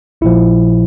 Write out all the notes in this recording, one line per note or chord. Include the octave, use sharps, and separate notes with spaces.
A#1 A#2 F3 E4